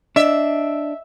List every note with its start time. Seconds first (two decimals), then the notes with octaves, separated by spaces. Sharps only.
0.16 D4 D#5 E5